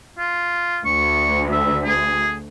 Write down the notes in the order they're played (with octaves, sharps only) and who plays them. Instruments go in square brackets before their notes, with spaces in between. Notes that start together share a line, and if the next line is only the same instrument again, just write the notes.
[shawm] F4
[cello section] D2 [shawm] C#6
[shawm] E5
G#4